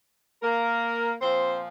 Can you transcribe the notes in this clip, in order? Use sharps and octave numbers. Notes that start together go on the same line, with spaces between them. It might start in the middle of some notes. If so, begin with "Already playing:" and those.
A#3 A#4
A#2 F3 C4 C5